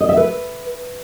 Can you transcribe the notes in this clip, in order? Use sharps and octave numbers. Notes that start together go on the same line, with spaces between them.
D#5
E5
B4